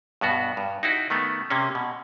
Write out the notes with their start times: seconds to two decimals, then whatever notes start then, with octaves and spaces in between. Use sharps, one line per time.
0.21 G2 B2 B3 F#4
0.57 G2
0.83 D#4 E4 F#4
1.10 D#3 A3 B3
1.50 C3 A#3 C#4
1.75 B2